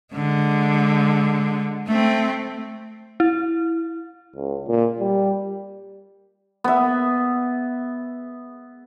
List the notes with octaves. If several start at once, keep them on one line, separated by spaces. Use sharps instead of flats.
D3 G#3
A3 C4
E4
C#2
A#2
G3
B3 E5